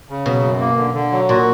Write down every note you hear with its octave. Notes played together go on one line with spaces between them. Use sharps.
C#3
B2 F#3
F#2
A#3
D3
D3
F#3
A#2 F#4